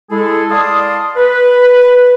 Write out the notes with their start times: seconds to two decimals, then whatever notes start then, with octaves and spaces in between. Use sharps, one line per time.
0.10 G#3 E4 G#4 A4
0.50 D5 F5 A5 C6 D#6
1.17 B4